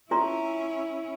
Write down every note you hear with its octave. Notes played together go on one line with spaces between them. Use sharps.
C#4 E4 F4 A#5 C6